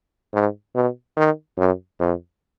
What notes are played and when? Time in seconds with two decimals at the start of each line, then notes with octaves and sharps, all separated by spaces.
0.34 G#2
0.75 B2
1.17 D#3
1.58 F#2
1.99 F2